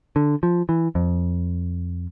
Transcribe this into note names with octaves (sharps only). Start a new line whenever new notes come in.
D3
F3
E3
F2